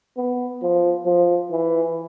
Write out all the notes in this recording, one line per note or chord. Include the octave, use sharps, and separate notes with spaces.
B3
F3
F3
E3